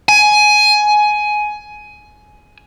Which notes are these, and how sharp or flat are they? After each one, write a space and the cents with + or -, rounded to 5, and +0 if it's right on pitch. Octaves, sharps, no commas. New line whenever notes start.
G#5 +15